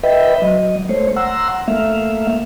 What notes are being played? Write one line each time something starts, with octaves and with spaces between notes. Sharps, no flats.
B4 D#5 E5 G5 B5
F#3 D#5
A3 C5 C#5
F#5 A#5 C6 E6
A3 A#3 E5 F5